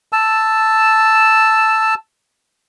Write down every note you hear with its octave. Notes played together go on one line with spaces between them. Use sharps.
A5 E6